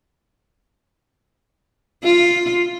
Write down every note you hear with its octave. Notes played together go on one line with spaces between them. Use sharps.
F4